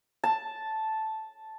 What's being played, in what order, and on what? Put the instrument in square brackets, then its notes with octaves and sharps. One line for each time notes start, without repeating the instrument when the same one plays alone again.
[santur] A5